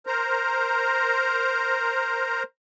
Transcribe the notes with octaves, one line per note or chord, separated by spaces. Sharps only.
A#4 C5 A#5